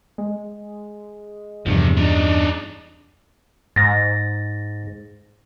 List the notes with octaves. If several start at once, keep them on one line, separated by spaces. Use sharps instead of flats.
G#3
E2 G2 C3 F3 G3
D4 D#4
G#2 A6 A#6